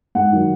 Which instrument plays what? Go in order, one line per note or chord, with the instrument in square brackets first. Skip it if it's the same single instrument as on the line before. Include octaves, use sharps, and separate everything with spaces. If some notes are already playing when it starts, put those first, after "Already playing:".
[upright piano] G#2 F#5
D#3 F#3